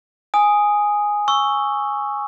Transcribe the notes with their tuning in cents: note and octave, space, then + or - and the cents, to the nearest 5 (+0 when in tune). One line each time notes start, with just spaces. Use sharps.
G#5 -5 D#6 +0
C#6 +0 E6 +0